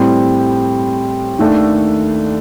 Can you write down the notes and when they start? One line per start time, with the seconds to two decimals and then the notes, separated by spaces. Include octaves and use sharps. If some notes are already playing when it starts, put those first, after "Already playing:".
Already playing: A2 G3 C4
1.39 D#2 D#3 A3 D4 A4